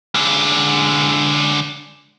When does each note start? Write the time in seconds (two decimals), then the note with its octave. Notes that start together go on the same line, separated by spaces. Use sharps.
0.15 D3 G#3